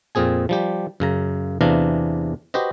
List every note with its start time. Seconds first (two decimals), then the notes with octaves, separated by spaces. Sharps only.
0.15 F2 A#2 C4 G#4 G#5
0.49 F3 G3 G4
1.00 F#2 C#3 A#5
1.61 E2 C3 E3 D4 F5 A#5
2.54 F#4 G4 B4 C5 D#5